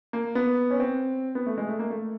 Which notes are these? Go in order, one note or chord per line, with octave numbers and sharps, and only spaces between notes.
A#3
B3
C#4
C4
B3
A3
G#3
A3
A#3
A3